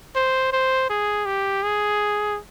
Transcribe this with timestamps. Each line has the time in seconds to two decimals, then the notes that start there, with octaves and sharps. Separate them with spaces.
0.15 C5
0.52 C5
0.89 G#4
1.25 G4
1.63 G#4